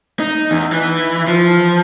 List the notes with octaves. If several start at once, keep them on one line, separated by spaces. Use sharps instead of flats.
D#4
E2
E3
F3